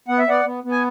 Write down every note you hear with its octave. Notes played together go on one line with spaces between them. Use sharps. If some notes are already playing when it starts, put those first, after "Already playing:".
B3 F#5
E5
B3 D5 F#5
B3
B3
G#5